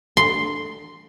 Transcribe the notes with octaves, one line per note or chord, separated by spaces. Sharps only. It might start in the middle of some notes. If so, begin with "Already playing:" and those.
C6